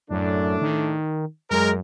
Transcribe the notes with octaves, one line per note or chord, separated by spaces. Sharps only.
F#2 A2 A3 D4
D#3
F#2 G#3 A#4